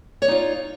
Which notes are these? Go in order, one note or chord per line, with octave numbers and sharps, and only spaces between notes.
D#4 F4 C#5 D5